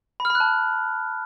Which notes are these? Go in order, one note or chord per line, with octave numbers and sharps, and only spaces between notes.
B5
F6
B5
F#6
A5